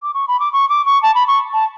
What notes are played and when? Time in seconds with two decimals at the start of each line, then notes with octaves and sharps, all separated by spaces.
0.03 D6
0.14 C#6
0.28 B5
0.40 D6
0.53 C#6
0.69 D6
0.86 C#6
1.03 A5
1.15 B5
1.27 C#6
1.53 A5